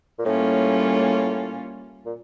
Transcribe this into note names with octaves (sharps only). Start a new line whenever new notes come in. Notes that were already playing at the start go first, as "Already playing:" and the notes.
A#2
A2 G3 A#3 C#4 F4
A#2